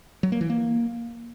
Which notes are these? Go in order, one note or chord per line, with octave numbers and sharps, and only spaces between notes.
F#3
A#3
E3
A#3